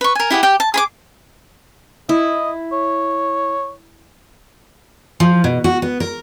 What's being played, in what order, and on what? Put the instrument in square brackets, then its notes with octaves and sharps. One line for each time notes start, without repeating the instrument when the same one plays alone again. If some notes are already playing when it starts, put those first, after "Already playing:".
[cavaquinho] B4 C#6
A#4 G#5
E4 G4 G#4 F#5
G4 G5
A5
G#4 B5 D6
[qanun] E4 [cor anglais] D#5
[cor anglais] C#5
[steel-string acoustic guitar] F3
B2
F#4
B3
A#4